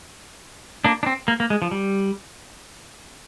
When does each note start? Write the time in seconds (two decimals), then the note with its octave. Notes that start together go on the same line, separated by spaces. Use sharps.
0.85 A#3 D4
1.03 D4
1.06 C4
1.28 A#3
1.40 A#3
1.50 G#3
1.62 F3
1.71 G3